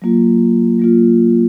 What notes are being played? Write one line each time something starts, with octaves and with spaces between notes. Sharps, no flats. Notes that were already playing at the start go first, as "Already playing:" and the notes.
F#3 A#3 F4
F#3 A#3 F4